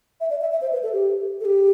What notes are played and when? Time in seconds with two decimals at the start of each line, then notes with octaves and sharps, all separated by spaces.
0.20 E5
0.30 D5
0.41 E5
0.52 E5
0.61 C5
0.73 B4
0.83 A4
0.93 G4
1.40 A4
1.45 G4